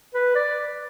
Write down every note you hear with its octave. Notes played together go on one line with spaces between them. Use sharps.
B4
D5